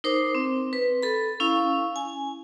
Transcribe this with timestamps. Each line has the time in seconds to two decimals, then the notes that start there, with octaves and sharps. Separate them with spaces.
0.04 D#4 A#4 C5 D6
0.35 C4
0.73 B4
1.03 A4 B5
1.40 C#4 E4 F5
1.96 G#5